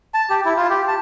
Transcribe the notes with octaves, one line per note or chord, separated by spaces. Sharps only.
A5
G4
E4
F4
G4
A5